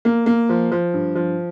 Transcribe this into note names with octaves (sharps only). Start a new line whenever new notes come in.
A#3
A#3
F3
F3
G2
F3